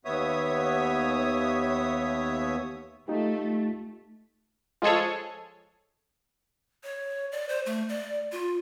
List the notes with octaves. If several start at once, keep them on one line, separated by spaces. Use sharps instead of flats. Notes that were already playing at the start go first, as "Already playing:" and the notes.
D#2 B3 C#5 E5 D#6
A3 D#4 F4 G4
F3 G#3 G#4 A4 C#5
C#5
D5
C5
A3
D5
F4